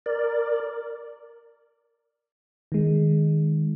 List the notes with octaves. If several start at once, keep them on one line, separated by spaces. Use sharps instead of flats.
A#4 D5
D#3 G#3